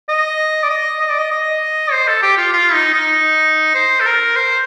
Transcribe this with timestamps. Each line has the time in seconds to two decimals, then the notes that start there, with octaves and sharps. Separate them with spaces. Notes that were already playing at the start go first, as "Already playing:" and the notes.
0.09 D#5
0.63 D5
0.70 D#5
1.01 D#5
1.10 D5
1.18 D#5
1.31 D#5
1.92 C5
2.08 A4
2.22 G4
2.37 F4
2.53 F4
2.73 D#4
2.94 D#4
3.75 C5
4.00 A4
4.06 A#4
4.36 C5